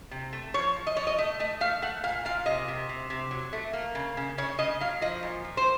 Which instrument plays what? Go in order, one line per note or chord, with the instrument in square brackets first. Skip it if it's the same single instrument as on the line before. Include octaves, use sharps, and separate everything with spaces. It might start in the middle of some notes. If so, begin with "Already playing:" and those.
[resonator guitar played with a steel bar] C3
A3
F3 C#5
F3
D#5
F3 C#5
D#5
A3 D#5
A3 D#5
A3 F5
A3 F#5
A#2 F5
A#2 F5
C3 D#5
C3
C3
C3
F#3
A3
A#3
C#3
C#3
C#3 C#5
C#3 D#5
F#3 F5
F3 D#5
A#2
F3
C5